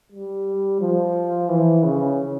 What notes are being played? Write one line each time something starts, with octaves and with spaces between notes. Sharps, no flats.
G3
F3
E3
C#3